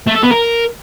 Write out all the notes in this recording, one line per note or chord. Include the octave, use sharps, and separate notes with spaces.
A3
A4
B3
A#4